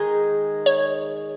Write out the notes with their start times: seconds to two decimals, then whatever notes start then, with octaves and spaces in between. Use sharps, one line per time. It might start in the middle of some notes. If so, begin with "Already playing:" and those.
Already playing: D#3 G#3 D#4 G#4
0.66 C#5